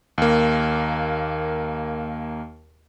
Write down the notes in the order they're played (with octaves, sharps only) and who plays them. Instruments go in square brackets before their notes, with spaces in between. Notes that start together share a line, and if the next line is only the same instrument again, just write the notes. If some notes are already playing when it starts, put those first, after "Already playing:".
[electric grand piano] D#2 A#3